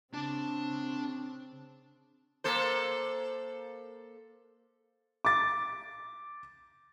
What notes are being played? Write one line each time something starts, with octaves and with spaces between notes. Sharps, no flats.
C#3 C4 D4 A5
A#3 A4 C5
D6 A6